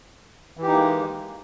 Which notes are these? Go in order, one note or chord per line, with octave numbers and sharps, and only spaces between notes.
E3 G#3 A#3 D#4 G4